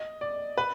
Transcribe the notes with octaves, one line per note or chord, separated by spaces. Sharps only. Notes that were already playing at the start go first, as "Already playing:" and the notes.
Already playing: D#5
D5
B4